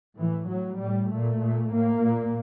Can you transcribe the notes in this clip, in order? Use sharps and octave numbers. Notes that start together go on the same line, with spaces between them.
A2 E3
A2 F#3
A2 G3
A#2 A3
A#2
A2 A#3
A#2